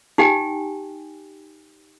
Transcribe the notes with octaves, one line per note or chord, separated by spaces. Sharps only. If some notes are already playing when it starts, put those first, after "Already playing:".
D#4 G4 G5 G#5